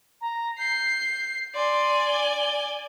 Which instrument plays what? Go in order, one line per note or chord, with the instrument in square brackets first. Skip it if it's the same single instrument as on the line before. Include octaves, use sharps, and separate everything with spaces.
[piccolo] A#5
[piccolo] G6 [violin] C7
[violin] D5 G#5 [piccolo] C6
[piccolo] G7